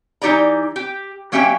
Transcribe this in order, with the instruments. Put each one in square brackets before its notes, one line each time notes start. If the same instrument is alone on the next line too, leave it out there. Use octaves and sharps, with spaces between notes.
[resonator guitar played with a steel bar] E3 D#4 G4 D5 A#5
G4
F#3 A#3 C#4 G4 E5 G5